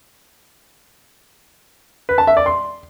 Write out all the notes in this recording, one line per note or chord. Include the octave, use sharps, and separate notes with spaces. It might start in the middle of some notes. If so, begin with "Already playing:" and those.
B4
A5
E5
D5
C6